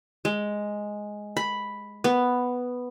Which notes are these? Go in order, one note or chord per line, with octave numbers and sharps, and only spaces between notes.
G#3
B5
B3